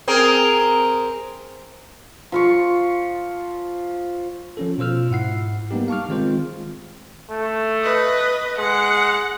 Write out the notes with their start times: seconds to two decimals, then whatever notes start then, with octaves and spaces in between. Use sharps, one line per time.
0.08 C4 G#4 A#4
2.32 F3 F4 C#6
4.57 F3 C#4 A4
4.78 B2 F4 C5 E6 F6
5.10 G#2 E4 F#5 C7
5.71 G3 A#3 B3 D#4 G4
5.88 F5 A5 C#6 D6 F6
6.09 D#3 G#3 C4 F4 C5
7.30 A3
7.82 B4 D#5
8.58 G#3 F#5